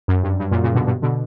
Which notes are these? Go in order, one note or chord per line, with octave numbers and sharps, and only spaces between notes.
F#2
G2
G2
F#2 A#2
A#2 C#3
B2 D3
G2 B2
B2 D3